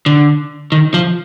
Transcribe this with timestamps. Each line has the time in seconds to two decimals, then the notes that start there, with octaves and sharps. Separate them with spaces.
0.06 D3
0.72 D#3
0.94 F3